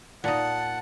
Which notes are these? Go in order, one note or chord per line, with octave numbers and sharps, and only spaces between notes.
A#2 D#4 F#5 A5